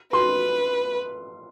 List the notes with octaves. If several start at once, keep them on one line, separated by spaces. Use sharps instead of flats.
B4 C6